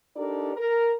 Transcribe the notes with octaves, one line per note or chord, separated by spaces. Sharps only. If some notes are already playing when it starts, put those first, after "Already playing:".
D4 D#4 G4 A4 A#4 D5
A#4